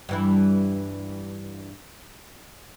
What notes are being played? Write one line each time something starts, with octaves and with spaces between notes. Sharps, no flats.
G2 E3 E4